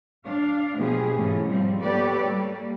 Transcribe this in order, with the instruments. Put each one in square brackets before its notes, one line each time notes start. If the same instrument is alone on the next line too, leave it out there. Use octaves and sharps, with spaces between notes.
[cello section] D4 F5
B2 F3 F#3 B3 G4 G#4
G#2 E3 A3 C#4
F3 G3 C4
B3 G4 A4 B4 C#5 D5
G3 A#3